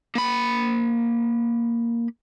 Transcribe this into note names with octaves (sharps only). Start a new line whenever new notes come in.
A#3 B5